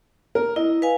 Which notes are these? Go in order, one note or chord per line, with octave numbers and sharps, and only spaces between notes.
A#4
E4 D#5
B4 F5 G#5